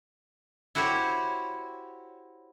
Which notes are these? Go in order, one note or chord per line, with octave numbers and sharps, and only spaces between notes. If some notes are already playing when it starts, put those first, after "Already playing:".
E4 F#4 G4 C5 C#5